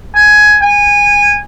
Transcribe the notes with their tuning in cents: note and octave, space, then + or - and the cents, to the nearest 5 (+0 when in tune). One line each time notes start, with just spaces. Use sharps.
G#5 +15
G#5 -20